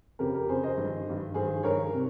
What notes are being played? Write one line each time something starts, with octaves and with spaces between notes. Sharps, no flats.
F2 C#3 G4 A#4
G4 A#4
F2 C#3 G#4 C5
C5 D#5
G2 D#3
G2 D#3
G2 D#3 G#4 C5
G2 D#3 A#4 C#5
C3